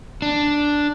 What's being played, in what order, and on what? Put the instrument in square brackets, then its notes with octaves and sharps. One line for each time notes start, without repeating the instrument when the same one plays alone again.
[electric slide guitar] D4